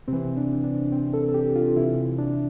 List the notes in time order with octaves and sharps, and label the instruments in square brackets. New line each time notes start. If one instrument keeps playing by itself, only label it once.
[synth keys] C3 E3 C4
D4
D4
C4
A4
A4
G4
F4
C3 E3 E4
D4